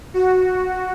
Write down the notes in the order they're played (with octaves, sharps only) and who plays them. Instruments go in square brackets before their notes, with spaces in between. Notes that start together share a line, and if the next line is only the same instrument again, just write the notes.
[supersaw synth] F#4